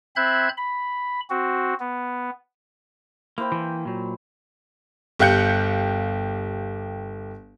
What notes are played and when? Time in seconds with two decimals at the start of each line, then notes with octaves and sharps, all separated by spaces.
0.16 C4 C5 E5 B5 F#6 G#6
0.57 B5
1.30 C4 F#4
1.80 B3
3.38 A#3 E4 C5 G5
3.52 E3 A#3
3.85 A#2 F#3
5.19 G1 G4 F5 F#6 G6 C#7